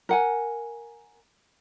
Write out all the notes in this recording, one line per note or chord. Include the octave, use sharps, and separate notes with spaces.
A#4 F#5 G#5